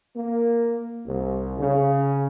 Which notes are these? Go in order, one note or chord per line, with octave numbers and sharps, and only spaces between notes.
A#3
C2
C#3